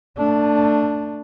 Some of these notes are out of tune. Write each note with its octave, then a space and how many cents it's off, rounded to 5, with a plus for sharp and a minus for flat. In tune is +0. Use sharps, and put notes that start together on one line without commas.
A3 +25 D4 +0